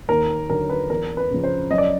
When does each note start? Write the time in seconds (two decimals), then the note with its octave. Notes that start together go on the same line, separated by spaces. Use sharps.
0.09 D#2 A#4
0.49 D3 F#3 A#4
0.70 B4
0.90 E2 A#4
1.17 B4
1.31 C#3 F3
1.43 C5
1.71 F#2 D#5
1.78 D5